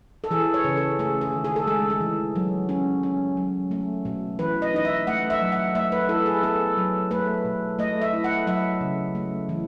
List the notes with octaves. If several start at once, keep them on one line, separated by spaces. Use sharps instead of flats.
A4
E3 G#4
C#5
C#3
A4
A3 G#4
G#4
D#3
G#4
A4
G#3 G#4
G#4
E3
F#3
C#4
C#4
F#3
A3
B2
E3 B4
D#5
D#4 D#5
E5
A3 F#5
E5
F#3
F#5
A3 E5
B4
E4 A4
G#4
B3 A4
F#3
A3 B4
B2
A3 D#5
E5
E4
F#5
F#3 E5
C#3
A3
E3